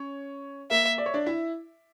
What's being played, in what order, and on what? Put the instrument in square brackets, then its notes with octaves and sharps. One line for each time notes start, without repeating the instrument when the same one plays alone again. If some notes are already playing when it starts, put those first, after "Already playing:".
Already playing: [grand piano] C#4 C#5
[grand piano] A#3 A#4 [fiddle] E5
[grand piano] D5
C#5
D4 D5
E4 E5